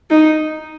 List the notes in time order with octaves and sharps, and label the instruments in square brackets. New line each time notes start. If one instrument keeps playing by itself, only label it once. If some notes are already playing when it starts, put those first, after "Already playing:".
[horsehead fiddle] D#4